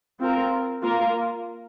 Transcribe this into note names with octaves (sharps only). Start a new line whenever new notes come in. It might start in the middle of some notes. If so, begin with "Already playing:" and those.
C4 F4 A#4
A#3 F4 A#4